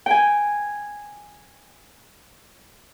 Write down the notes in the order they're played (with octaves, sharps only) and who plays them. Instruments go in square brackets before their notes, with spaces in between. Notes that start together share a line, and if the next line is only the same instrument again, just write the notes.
[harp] G5 G#5